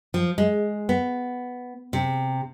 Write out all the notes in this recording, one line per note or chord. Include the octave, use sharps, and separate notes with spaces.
F3
G#3
B3
C3